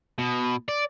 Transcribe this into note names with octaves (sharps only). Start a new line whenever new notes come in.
B2
D5